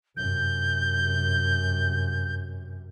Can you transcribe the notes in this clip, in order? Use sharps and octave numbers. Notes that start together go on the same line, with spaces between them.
F#2 C3 G6